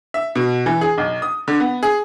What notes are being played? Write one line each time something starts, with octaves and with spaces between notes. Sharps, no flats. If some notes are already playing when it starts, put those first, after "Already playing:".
E5
B2
E3
G#4
B1
D#6
D3
B3
G#4